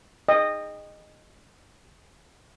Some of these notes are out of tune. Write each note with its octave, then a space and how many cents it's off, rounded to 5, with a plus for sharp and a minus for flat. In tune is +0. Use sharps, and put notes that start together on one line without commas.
D#5 -15 G5 +25